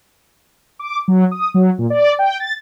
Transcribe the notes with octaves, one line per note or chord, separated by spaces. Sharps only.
D6
F#3
D#6
F#3
A#2
D5
G5
A6